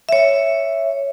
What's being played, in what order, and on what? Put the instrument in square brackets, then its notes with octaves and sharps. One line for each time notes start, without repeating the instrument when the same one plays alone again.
[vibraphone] C#5 E5